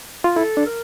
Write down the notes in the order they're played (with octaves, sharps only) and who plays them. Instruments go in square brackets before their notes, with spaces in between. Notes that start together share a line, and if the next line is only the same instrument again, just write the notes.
[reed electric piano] F4
[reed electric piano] E4 [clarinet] A4
[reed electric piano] D4
[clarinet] A#4